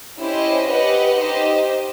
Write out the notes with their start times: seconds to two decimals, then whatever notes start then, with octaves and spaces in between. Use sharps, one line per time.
0.20 C#4 E4 G4 C5 D#5
0.67 G4 B4 D#5 F#5
1.16 D#4 G4 C5 D#5